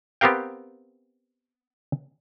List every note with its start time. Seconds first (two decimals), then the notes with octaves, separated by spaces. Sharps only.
0.21 B3 C4 G4 A#4 F5 G5